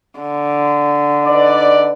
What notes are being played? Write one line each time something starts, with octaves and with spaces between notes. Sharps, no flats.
D3
D#4 B4 D5